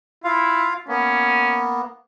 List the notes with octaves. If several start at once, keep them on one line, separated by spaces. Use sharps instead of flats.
E4 F4 F5
A#3 B3 C#4